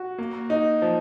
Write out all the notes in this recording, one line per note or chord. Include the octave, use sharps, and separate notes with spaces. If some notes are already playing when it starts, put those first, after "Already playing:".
Already playing: F#4
A#3
D#4
F3